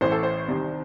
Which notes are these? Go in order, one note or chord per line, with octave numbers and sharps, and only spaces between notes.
A1 A2 E3 C5
A4
C5
C2 C3 D#3